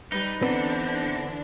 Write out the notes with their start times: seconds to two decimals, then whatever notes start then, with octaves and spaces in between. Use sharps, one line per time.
0.12 G3 D#4 B4
0.42 D3 E3 B3 C4 D4 B4